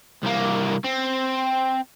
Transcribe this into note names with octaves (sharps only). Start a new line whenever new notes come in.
C2 A#3
C4